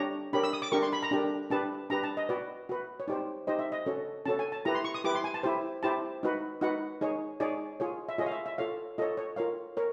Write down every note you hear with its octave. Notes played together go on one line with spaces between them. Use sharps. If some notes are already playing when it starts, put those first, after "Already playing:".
Already playing: D4 G4 C#5 A#5
D4 G4 A#4 C#5 B5
E6
D#6
D6
D4 G4 A#4 C#6
C6
B5
A#5
D4 G4 A#4
D4 G4 B4 A5
D4 G4 B4 A#5
A5
D#5
F#4 B4 D5
F#4 B4
C#5
D#4 G4 C5 D5
D#4 G4 C5 D#5
E5
D#5
C#4 F#4 A4 C#5
C#4 F#4 A4 C#5 A5
G#5
A5
E4 G4 B4 A#5
C6
C#6
D#6
E4 G4 B4 D6
C6
G#5
A5
E4 G4 C5
E4 G4 C5 A5
D#4 F#4 B4
D#4 F#4 B4 F#5
D#4 G#4 C#5
D#4 G#4 C#5 D5
F4 G#4 C#5
E5
F4 G#4 C#5 D#5
F5
E5
E5
F4 A4 C#5 F5
F4 A4 C#5 D#5
C#5
F4 A#4 C#5 F5
A#4 C#5